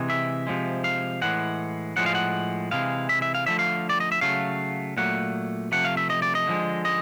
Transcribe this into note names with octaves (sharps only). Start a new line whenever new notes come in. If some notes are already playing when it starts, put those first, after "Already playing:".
Already playing: C3 E3 G#3
E5
C3 F3 G#3
F5
A2 E3 G#3 F#5
A2 F3 G#3 F#5
F5
F#5
C3 E3 G#3 F5
E5
E5
F5
D3 F3 A3 E5
F5
D5
D#5
E5
C#3 F#3 A3 F5
A#2 F#3 A3 F#5
C3 F3 A3 F#5
F5
E5
D#5
D5
D#5
D3 F3 G#3
D#5